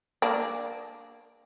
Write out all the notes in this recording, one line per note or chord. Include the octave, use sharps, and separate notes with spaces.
A#3 D4